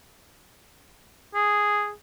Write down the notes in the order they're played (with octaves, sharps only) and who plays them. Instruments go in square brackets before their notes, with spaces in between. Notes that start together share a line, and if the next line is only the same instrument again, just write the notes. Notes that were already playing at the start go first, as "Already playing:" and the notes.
[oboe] G#4